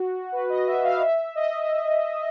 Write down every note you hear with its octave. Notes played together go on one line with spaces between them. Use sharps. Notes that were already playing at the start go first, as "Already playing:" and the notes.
Already playing: F#4
B4
D#5
E5
F5
E5
D#5